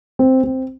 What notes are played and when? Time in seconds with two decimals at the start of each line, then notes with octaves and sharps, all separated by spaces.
0.19 C4
0.43 C4